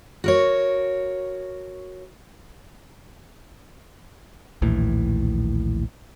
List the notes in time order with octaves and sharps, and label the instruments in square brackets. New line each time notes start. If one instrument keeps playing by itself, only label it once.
[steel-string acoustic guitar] F#4 A#4 C#5
[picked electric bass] A#1 D#2 A2 E3